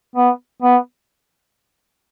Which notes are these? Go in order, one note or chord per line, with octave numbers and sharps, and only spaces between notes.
B3
B3